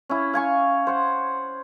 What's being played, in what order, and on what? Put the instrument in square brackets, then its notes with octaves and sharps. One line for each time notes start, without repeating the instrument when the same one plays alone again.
[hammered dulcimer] C#4 E4
F5 G#5 C#6
C5 F#5